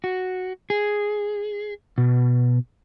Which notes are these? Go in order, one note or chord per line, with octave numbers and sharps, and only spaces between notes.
F#4
G#4
B2